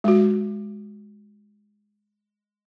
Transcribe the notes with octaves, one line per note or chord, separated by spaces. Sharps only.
G#3 F#4